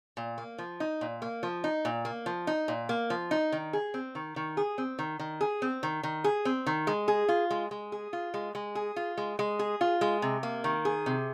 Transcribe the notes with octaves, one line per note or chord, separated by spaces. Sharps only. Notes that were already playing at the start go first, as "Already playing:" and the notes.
A#2
A#3
F3
D#4
A#2
A#3
F3
D#4
A#2
A#3
F3
D#4
A#2
A#3
F3
D#4
D#3
G#4
C4
D#3
D#3
G#4
C4
D#3
D#3
G#4
C4
D#3
D#3
G#4
C4
D#3
G#3
G#4
F4
G#3
G#3
G#4
F4
G#3
G#3
G#4
F4
G#3
G#3
G#4
F4
G#3
C3
A#3
D#3
G#4
C3